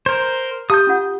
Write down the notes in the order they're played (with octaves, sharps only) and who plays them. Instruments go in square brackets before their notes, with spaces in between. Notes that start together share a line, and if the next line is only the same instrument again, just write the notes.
[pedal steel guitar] A#4 C5
[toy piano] G4 F5 A5 [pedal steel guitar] D#6 G6
[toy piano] C#4 F4 F#5